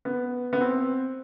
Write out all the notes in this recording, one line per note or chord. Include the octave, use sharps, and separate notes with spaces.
B3
B3
C4